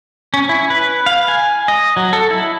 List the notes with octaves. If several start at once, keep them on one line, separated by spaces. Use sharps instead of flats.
C#4
E4
B4
F5
G#5
D#5
F#3
A4
E4